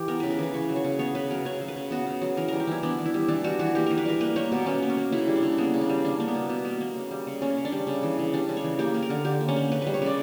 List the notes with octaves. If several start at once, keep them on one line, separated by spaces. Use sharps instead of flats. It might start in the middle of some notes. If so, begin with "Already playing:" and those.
Already playing: E3 G4
B3 A#4
C#3 B4
A#4
E3 B4
C#3 C#5
F#3
C#5
C#3
B3 C#5
C#3 B4
F#3 A#4
C#3 C#5
F#3
B4
C#3
B3 F#4
C#3
F#3
E3 A#4
G3 A#4
G4
E3 E4
B3 D4
E3
E4
G3
E3 D4
G3 F#4
E3 F#4
A#3 G4
E3 A#4
B4
G3 A#4
A#3 B4
A#3 C#5
B2 A#4
B2 C#4
A#3
C#4
A#3
C#3 E4
G3
D4
C#3
A#3 B3
C#3
D4
G3
A#3 D4
A#3
B3
B2
B2
A#3
A#3
C#3
G3
C#3
A#3 C#4
C#3
D4
G3
C#3
E3
C#3
G3 D4
C#3
C#5
E3
A#3 G4
A#3
A#4
D3
D3 G4
A#3
C#4
A#3
C#3 B4
G3 B4
C#5
C#3 D5